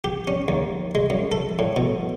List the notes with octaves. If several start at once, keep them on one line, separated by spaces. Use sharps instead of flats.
G4
C#4
D#2
G#3
F#2
A4
A2
B2